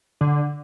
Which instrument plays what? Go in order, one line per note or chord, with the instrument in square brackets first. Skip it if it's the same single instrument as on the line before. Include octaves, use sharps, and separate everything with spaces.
[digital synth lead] D3